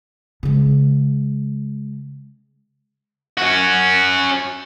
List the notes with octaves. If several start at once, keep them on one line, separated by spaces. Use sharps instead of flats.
C#3 G#3
C#4 F#4